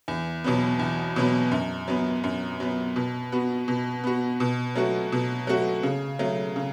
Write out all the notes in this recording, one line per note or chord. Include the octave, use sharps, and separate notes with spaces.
E2
B2 F#3 B3
E2
B2 F#3 B3
F#2
F#3 B3
F#2
F#3 B3
B2
B3 F#4
B2
B3 F#4
B2
F#3 A3 F#4
B2
F#3 A3 F#4
C#3
F#3 A3
C#3